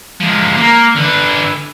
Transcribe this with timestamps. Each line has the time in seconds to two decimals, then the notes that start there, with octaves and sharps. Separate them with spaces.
0.20 F3 G#3
0.57 A#3
0.96 D3 B4